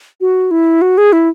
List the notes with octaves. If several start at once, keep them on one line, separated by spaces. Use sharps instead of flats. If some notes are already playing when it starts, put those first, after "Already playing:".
F#4
E4
F#4
G#4
E4